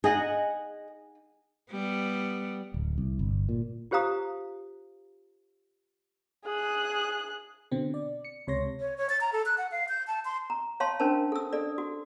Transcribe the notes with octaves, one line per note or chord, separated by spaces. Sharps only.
D#4 G#4 D#5 F#5
G3 B3
D1
C2
G1
A#2
F4 G4 C5 F5 A#5 D#6
G#4 F#6
B2 D3 C4
D5
C#7
C#2 C3 C#5 C6 A#6
C#5
C#5
A6
A#5
A4
F#6
F#5
F5
G6
A5
C6
A#5
C#5 F5 A5 C6
C#4 D4 A#4 C5 A5
A4 E6
A4 D5
F#4